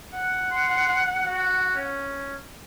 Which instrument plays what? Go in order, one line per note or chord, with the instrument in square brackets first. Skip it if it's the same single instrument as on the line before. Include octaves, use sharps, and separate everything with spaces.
[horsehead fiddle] F#5
[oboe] C6
F#4
C#4